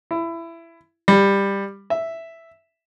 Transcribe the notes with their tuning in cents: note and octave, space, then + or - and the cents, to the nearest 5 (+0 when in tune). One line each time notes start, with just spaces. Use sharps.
E4 +20
G3 +15
E5 +0